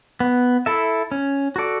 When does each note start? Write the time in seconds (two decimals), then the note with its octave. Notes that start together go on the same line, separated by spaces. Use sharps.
0.20 B3
0.66 E4 A4 E5
1.12 C#4
1.56 F#4 A4 D5